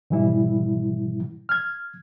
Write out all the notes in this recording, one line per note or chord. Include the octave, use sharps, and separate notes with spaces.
G#2 B2 E3 G3 E4
F6 G#6